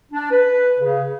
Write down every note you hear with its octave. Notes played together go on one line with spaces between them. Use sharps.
D4
B4
C#3